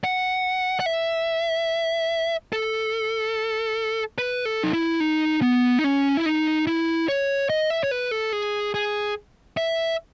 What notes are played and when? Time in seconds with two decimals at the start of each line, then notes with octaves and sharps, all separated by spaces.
0.04 F#5
0.80 F#5
0.86 E5
2.53 A4
4.18 B4
4.45 A4
4.63 D#4
4.73 E4
5.00 D#4
5.42 B3
5.79 D#4
5.84 C#4
6.17 E4
6.26 D#4
6.67 E4
7.08 C#5
7.50 D#5
7.70 E5
7.84 C#5
7.91 B4
8.11 A4
8.33 G#4
8.74 G#4
9.57 E5